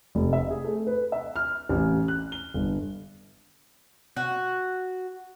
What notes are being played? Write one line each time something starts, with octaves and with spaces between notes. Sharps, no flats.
F1
E5
G#4
A3
B4
E5
F6
A1
F#6
G7
G1
F#4